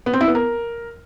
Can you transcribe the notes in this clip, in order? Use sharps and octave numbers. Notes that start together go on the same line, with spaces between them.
B3
C4
E4
B3
A#4